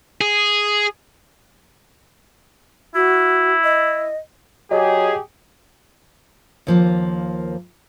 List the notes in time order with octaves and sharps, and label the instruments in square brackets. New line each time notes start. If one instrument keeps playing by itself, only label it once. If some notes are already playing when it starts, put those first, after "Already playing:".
[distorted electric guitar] G#4
[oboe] E4 [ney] F#4
[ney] D#5
[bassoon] F#3 [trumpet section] G4 G#4 [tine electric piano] D#5
[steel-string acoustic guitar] D#2 F3 A#3